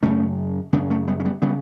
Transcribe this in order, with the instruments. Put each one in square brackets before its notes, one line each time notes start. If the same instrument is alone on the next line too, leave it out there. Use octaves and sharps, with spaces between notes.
[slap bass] F#2 C#3 A3 C#4
F#2 C#3 B3 D4
A3 C#4
G3 B3
C#4
G3 B3
C#3 G3 B3